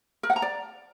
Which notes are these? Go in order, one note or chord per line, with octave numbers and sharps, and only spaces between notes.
A#4
F#5
A#5
D5